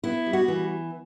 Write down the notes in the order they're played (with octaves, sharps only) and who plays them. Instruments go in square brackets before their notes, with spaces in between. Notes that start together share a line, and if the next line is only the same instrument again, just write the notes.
[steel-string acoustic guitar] B3 E4
G3
F#4
E3